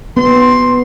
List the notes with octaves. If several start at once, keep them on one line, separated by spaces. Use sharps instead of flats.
B3 C6